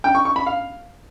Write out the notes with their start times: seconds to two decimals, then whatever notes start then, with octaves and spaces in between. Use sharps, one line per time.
0.04 G5
0.15 C#6
0.25 C#6
0.36 B5
0.47 F5